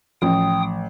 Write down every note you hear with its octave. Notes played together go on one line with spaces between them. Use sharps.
A1 F3 G5 D#6